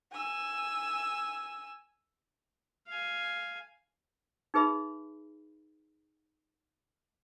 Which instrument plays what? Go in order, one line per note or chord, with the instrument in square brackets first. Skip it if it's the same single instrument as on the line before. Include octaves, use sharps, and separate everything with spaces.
[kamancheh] G#5 E6
[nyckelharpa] F5 G#5
[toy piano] D#4 G#4 B4 E5 B5